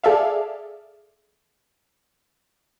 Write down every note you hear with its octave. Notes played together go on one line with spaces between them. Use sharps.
G#4 A4 D5 E5 F5